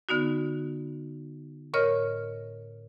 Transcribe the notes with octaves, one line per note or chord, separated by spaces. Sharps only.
D3 B3 D#4 F#4
A2 A#4 C#5 D#5 F6